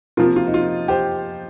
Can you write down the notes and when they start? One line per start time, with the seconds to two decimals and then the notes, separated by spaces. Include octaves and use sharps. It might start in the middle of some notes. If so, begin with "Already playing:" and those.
0.17 C3 F3 A#3 F4 A#4
0.36 F4
0.47 D#4
0.54 F4
0.88 G4 C5